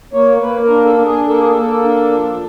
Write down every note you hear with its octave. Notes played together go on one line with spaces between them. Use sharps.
A#3 C#5
A#3 B4
A#4
D4
A4
D4
G#4
A#3 A4
G#4
A#3 A4
D4
F3